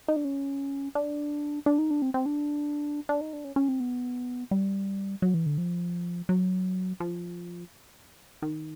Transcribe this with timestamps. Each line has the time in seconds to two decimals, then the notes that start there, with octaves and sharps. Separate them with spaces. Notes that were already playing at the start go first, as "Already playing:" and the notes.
0.08 D#4
0.16 D4
0.25 C#4
0.95 D4
1.66 D4
1.79 D#4
1.91 D4
2.02 C4
2.14 C4
2.26 D4
3.09 D4
3.21 D#4
3.33 D4
3.44 C#4
3.56 C#4
3.69 C4
3.80 B3
4.51 G3
5.22 F#3
5.34 E3
5.46 D3
5.58 F3
6.29 F#3
7.00 F3
8.42 D#3